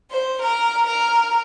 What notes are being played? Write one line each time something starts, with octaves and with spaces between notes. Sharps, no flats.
C5
A#4
A#4